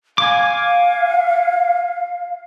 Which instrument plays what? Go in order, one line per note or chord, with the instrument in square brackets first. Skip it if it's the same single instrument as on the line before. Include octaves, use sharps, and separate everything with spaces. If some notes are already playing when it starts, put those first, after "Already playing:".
[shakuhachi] F5 [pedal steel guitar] G#5 D6